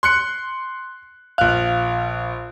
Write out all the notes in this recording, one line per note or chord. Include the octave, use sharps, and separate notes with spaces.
C6 F#6 C#7
A#1 F5 F#6